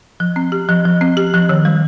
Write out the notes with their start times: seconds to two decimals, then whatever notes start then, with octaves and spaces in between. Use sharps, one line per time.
0.20 F3
0.36 C4
0.52 G4
0.69 F3
0.85 F3
1.01 C4
1.17 G4
1.34 F3
1.49 D#3
1.65 G3